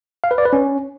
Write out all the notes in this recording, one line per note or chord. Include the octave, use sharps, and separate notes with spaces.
F5
B4
D5
B4
C#4